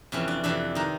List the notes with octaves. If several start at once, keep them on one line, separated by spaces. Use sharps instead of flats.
F2 C3 E3 C#4
D4
F2 C3 E3 D4
D#3 D#4